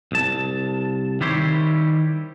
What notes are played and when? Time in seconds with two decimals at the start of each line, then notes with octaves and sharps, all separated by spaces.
0.12 C2 A5
1.21 D#3 G3 E4 G4 C5 C#5